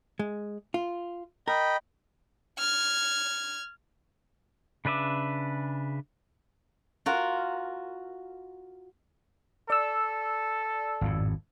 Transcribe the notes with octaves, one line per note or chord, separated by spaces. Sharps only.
G#3
F4
A#4 D#5 G5 B5
F6 G#6
C#3 D4 B4 E5 D6
F4 F#4 A#4
A4 D5 E6
G#1 F2 A2